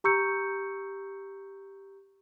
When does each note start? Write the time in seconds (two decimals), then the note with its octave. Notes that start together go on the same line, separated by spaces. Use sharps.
0.04 G4 A#5 C#6 E6 G6 C#7